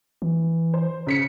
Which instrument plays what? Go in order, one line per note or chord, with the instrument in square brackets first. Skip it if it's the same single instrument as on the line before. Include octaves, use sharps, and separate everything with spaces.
[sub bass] E3
[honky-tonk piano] C5
C#3 B6 C#7